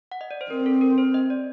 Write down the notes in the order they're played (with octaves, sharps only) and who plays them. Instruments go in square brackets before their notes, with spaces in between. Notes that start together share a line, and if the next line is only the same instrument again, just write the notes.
[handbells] F#5
D#5
D5
C5
[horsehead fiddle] C4 [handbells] A#4
[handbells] A4
A#4
C5
D#5
D5